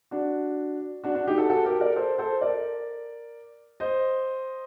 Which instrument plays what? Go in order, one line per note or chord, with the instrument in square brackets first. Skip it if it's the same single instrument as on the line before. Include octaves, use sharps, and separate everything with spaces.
[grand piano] D4 F#4
D4 F#4
D4 F#4
D#4 G4
F#4 A4
F#4 A4
G4 A#4
A#4 D5
A4 C5
A4 C5
A#4 D5
C5 D#5